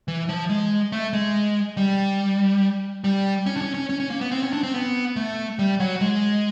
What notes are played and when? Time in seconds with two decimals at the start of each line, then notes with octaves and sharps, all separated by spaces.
0.08 E3
0.29 F3
0.49 G#3
0.92 A3
1.13 G#3
1.77 G3
3.04 G3
3.46 C#4
3.56 D4
3.61 C#4
3.75 C#4
3.89 C#4
4.00 C#4
4.10 A#3
4.21 B3
4.32 C4
4.43 C#4
4.53 D4
4.63 C4
4.74 B3
5.16 A3
5.59 G3
5.80 F#3
6.01 G#3